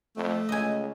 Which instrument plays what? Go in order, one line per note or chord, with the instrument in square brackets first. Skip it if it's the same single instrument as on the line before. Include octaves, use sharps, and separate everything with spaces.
[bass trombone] F2 [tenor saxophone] A3
[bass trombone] C#2 [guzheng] D#5 G#5